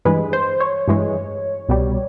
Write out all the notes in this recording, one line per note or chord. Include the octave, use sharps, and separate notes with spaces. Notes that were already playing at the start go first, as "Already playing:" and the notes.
G2 E3 G#3 B4
C5
C#5
G2 E3 G#3
C2 B2 G3